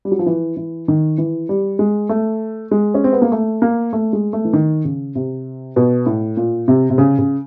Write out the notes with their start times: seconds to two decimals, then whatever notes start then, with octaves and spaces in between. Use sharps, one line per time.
0.05 G3
0.12 F#3
0.19 F3
0.26 E3
0.57 E3
0.88 D#3
1.18 E3
1.49 G3
1.79 G#3
2.09 A3
2.71 G#3
2.94 C#4
3.04 C4
3.13 B3
3.22 A#3
3.32 A3
3.62 A#3
3.93 A3
4.13 G#3
4.33 A3
4.45 E3
4.53 D#3
4.85 C#3
5.15 C3
5.76 B2
6.06 A2
6.37 A#2
6.68 C3
6.90 C3
6.98 C#3
7.18 C#3